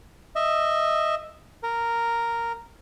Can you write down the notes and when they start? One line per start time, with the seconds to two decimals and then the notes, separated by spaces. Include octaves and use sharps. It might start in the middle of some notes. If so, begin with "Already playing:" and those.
0.36 D#5 E5
1.63 A#4